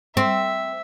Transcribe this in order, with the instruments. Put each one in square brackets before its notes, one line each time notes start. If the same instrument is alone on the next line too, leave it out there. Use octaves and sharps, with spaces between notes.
[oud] C4 [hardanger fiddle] E5